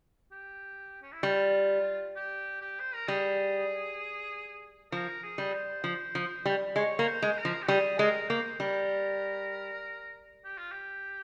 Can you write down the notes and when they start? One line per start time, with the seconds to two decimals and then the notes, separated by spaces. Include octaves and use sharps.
0.32 G4
1.02 C#4
1.13 E4
1.23 G3 F4
2.16 G4
2.61 G4
2.80 C5
2.94 A#4
3.08 G3 G#4
4.92 F3 A#4
5.23 G#4
5.38 G3
5.53 C5
5.84 F3
6.15 F3
6.46 G3
6.76 G#3 C#5
6.99 A#3
7.07 C5
7.22 G#3
7.38 A#4
7.45 F3
7.62 G4
7.68 G3 G#4
7.98 G#3 A#4
8.29 A#3 C5
8.60 G3 A#4
10.45 G4
10.58 F4
10.72 G4